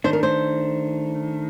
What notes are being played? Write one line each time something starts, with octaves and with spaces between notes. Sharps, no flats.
D#3 A3 D4 C5
A#4
C5